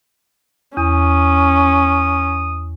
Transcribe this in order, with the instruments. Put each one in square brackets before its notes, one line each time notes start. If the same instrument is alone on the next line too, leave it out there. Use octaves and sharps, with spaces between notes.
[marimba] E2 [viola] C#4 [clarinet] D#6